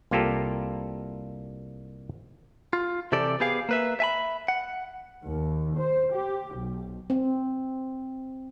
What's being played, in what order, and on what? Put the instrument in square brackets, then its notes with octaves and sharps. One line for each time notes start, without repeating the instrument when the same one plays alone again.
[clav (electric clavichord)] C2 A#3 F4 G4 A4
[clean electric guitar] F4
C3 E3 G4 A4 D5
B3 G4 G#4 F5
A#3 B4 E5
E5 G#5 B5
F#5
[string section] D#2
C5
G4
B1
[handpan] C4